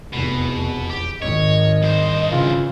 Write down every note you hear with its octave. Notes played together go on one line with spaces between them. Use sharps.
F1 E2 B2
G4
G#1 D#3 C#5 D#5
G2 C5
C#3 E3 F4